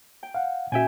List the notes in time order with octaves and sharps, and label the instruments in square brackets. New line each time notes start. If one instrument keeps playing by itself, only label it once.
[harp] G5
[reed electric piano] F5 F#5
[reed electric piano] A#2 C#4 F#4 [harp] E5 G5 G#5